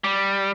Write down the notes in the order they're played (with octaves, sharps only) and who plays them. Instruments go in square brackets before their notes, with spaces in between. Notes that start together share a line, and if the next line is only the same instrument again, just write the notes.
[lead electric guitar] G3